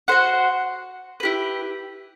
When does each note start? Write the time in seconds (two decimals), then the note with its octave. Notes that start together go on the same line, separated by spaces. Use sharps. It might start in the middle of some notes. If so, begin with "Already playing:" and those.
0.08 F#4 C5 F#5
1.20 E4 G4 B4